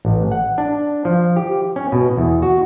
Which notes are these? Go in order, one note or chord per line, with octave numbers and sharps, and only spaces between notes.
A1
F#5
D4
F3
G4
C#4
B2
E2
F#4